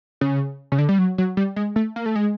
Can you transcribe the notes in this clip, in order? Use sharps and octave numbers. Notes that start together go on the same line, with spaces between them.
C#3
C#3
D3
G3
F#3
F#3
G3
G#3
A3
A#3
A3
G#3